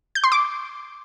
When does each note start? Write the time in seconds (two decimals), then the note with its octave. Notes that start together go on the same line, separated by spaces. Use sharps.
0.15 G6
0.24 C6
0.32 D6